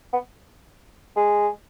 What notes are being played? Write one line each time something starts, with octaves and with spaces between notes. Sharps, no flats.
B3
G#3